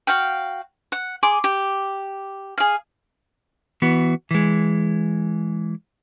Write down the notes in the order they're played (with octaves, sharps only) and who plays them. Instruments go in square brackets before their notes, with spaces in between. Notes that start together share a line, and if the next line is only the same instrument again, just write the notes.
[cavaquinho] F#4 F5 G5
F#5
G#4 C6 D6
G4
G#4 F5
[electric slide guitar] E3 B3 F#4
E3 G#3